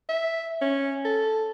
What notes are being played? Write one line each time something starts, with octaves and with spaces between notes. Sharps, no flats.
E5
C#4
A4